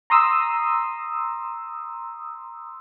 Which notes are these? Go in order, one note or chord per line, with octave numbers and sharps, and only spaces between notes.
A#5 C6 D#6 E6